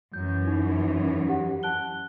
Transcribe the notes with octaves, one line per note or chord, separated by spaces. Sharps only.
F#2 E3 G6
D#4
G4 F#5
A5 F#6 G7